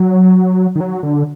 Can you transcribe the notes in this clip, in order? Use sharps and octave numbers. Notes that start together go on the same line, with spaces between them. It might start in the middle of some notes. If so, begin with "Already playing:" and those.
Already playing: F#3
D#3
F#3
D3